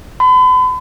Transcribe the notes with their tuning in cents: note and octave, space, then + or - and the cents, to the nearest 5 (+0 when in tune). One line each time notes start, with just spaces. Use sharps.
B5 +40